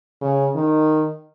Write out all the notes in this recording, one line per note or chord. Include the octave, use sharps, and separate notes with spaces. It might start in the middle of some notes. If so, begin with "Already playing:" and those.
C#3
D#3